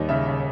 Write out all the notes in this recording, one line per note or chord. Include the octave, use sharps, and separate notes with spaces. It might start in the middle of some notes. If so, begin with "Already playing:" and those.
Already playing: D#2 G3 D#5
C#3 E5
C#3